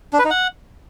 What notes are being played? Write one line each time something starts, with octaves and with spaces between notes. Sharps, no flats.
D4
B4
D#4
F#5